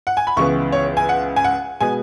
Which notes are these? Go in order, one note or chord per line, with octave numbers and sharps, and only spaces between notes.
F#5
G#5
B5
C#2 C#3 E3 B3 C#6
C#5
G#5
F#5
G#5
F#5
B2 G#3 B3 G#5